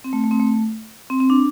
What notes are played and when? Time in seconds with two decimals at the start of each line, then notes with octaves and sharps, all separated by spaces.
0.04 C4
0.13 A3
0.24 A3
0.31 C4
0.39 A3
1.10 C4
1.20 C4
1.30 D4